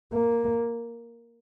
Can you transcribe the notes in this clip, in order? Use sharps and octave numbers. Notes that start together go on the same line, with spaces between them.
A#3